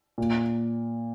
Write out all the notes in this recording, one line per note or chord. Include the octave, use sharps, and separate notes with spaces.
A#2